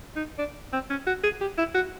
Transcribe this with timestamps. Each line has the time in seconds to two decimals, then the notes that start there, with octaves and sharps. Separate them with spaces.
0.16 D#4
0.38 D4
0.73 C4
0.90 C#4
1.07 F#4
1.23 G#4
1.41 G4
1.58 E4
1.75 F#4